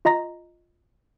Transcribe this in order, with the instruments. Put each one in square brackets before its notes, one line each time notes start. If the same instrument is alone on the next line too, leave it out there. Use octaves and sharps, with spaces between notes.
[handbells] F4 D#5 A#5 A#6